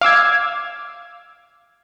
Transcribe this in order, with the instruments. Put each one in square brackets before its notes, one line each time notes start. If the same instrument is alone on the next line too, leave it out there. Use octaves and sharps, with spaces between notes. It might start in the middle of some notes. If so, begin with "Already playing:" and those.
[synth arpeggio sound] F5 D6 E6 G#6